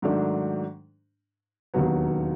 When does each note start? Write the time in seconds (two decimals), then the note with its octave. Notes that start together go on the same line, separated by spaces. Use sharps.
0.02 G#2 D#3 F#3 A3 D4
1.74 E1 D#2 D#3 F#3 B3